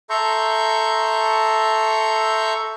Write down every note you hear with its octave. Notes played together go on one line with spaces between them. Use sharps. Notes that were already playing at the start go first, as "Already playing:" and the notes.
A4 E5 A#5 C6 C#6 G6